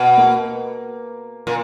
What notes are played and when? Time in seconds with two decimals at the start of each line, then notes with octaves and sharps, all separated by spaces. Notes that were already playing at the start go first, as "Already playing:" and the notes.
Already playing: B2
0.18 A#3 A#4
1.47 A#2